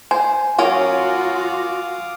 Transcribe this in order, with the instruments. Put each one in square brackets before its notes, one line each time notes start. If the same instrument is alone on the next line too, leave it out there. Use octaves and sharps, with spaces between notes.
[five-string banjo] C5 [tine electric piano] G#5
[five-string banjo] F#3 C#4 A#4 [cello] F4 F#4 [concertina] F5 D6 D#6